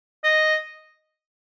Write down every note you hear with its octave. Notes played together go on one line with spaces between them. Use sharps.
D#5